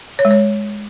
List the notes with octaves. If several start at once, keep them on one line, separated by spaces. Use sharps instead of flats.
C#5
G#3
C#5